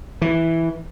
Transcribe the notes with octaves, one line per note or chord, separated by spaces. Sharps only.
E3